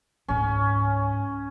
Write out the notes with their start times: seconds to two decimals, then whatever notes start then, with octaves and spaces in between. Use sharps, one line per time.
0.28 C#2 G#2 C#4